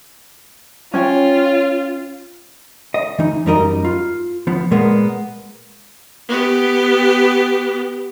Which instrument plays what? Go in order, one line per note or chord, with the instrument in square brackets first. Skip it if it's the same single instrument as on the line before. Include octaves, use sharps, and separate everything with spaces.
[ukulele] C#4 C#5 G5 [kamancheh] F4
[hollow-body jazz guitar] D#5
E3 D#4
F#2 G3 D#4 A#4 D#5 A#5
F4
F3 B3
A#2 G#3 A#3 B3
[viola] B3 G4